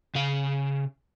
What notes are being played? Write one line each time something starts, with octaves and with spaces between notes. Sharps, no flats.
C#3 F5